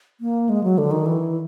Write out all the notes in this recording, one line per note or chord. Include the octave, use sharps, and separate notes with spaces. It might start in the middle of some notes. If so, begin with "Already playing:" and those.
A#3
G#3
F#3
D3
D#3
E3